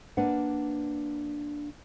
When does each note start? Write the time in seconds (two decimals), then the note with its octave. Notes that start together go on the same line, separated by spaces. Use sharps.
0.17 A#3 D4 B4 D5 F#5